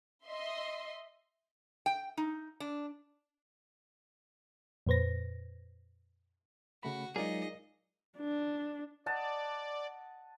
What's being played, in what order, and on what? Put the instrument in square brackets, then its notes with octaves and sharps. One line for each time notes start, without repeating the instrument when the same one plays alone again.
[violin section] D#5 E5 C6
[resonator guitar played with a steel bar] G5
D#4
D4
[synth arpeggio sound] F2 A#2 B4 C5 A#6
[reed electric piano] C#3 A3 B5 [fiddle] F#4
[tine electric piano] F#3 G#3 [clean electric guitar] D#4 F4 G#4 [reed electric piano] A#4 D5 [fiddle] D#5
[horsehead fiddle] D4
[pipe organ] D5 [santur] D#5 F#5 A5